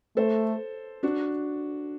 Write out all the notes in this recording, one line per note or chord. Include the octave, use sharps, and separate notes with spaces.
A3 A4 C5
D4 F#4